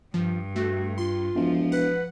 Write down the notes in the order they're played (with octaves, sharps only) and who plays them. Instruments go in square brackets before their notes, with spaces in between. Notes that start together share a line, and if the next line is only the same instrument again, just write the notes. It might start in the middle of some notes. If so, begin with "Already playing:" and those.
[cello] G2 [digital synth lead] F3
[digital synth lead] A3 [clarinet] F#4
[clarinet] F4 [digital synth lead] C6
[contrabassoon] E1 [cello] F3
[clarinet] B4 [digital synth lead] F#5